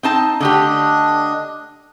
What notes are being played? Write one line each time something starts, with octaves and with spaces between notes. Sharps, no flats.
C4 D#4 A5
D3 A3 D4 G4 D#5